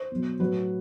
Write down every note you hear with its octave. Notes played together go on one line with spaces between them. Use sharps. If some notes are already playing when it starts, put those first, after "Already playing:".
Already playing: C5
B2 F#3
A2 F#3 B4